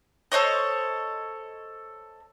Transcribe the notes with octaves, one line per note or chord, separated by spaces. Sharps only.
A4 C5 C#5 D#5